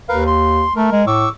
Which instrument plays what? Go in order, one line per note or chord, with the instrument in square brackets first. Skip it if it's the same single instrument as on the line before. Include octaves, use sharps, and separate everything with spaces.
[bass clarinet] D#2 [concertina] A#4 B4 F5
[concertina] C6
[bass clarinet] A3 [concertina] A#4
[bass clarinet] G#3
[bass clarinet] A2 [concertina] C#6 D6 E6